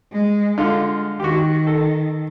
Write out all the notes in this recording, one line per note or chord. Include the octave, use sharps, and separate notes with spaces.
G#3
D3 G#3 F4
D#3 F#4 G4
A4